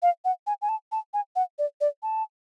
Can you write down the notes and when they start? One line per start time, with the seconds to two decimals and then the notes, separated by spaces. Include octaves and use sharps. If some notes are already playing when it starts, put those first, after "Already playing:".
0.02 F5
0.25 F#5
0.47 G#5
0.62 G#5
0.69 A5
0.92 A5
1.14 G#5
1.36 F#5
1.59 D5
1.81 D5
2.03 A5